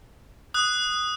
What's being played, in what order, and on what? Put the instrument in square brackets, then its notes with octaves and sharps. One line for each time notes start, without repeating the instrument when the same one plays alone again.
[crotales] D#6 F#6